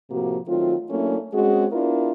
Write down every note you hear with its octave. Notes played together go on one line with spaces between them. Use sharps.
A2 C3 F3 A#3 F#4
D#3 F#3 A3 C4 F4
F#3 A3 A#3 C#4 D4 E4
G#3 C4 C#4 F#4 G#4
B3 D4 E4 F4 A#4